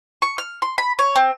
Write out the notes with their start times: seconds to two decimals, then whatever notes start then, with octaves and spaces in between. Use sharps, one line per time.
0.22 C#6
0.38 F6
0.62 C6
0.78 B5
0.99 C#5
1.16 C4